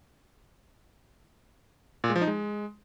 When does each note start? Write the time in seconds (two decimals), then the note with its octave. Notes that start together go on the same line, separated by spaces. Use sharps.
2.04 A#2
2.10 G#3
2.16 F3
2.21 D#4
2.27 G#3